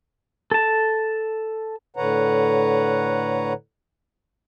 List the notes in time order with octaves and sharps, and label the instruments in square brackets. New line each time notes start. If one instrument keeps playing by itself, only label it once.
[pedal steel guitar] A4 A5
[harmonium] A2 D3 B4 C#5 F#5 A#5